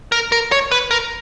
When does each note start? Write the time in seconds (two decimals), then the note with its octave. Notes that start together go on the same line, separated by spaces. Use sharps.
0.12 A#4
0.32 A#4
0.52 C#5
0.72 B4
0.91 A#4